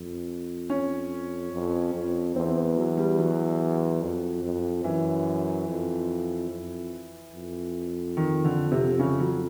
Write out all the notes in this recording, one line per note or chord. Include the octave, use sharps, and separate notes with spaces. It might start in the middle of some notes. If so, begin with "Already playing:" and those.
Already playing: F2
C#4
F2
F2
E2 C4
B3
F#3
G3
F#3
F2
F2
F#2 E3
F2
F2
F2
D#3
D3
C3
C#3
F#3